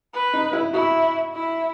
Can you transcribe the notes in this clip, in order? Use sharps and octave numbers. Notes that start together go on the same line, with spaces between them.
B4
D#4
E4
E4 F#4
E4